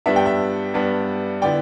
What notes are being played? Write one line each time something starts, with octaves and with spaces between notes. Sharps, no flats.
G2 G3 B3 D4 E5
G5
E5
G2 G3 B3 D4
D3 B3 E4 D5 G5